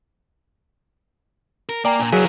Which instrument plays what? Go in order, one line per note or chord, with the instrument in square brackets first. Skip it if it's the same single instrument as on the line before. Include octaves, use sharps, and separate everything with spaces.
[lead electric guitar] A#4
[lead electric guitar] A#3 [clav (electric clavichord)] D5 [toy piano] G5 G#5 A#5
[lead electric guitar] A#2 [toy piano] D4
[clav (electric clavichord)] F#3 G#4 [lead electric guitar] E4 A#4 [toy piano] B4 F5